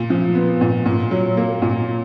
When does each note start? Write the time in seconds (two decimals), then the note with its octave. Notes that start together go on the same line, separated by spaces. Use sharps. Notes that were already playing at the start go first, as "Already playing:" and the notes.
Already playing: A#2
0.10 F3
0.35 B3
0.61 A#2
0.86 A#2
1.11 F#3
1.37 A#3
1.62 A#2